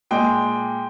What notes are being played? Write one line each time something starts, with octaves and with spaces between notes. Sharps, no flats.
A#2 G#3 G5